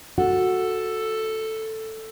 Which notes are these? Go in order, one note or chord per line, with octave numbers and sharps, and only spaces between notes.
F#4 A4